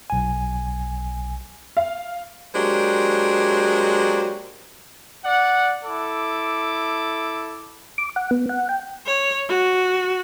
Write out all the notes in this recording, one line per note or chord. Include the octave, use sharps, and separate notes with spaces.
B1 G#5
F5
F#3 G#3 A#3 D4 G4 C5
D5 F#5
E4 A4 D6
D6
F#5
B3
F#5
G5
C#5
F#4